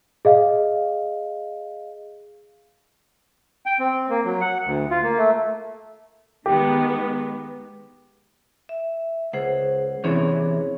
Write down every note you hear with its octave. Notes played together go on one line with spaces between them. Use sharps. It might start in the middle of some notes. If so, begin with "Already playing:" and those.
G#4 D#5 F5
G5
C4
A#3
F#3
F#5
D2
F4
A#3
A3
D#3 G#3 B3 G4
E5
C#2 G#4 C5 F#5
E2 C3 E3 C#4 G#4 C#5